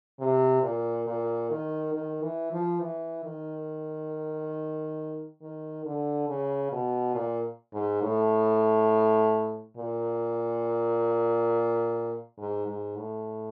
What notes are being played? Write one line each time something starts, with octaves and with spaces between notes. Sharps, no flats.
C3
A#2
A#2
D#3
D#3
E3
F3
E3
D#3
D#3
D3
C#3
B2
A#2
G#2
A2
A#2
G#2
G#2
A2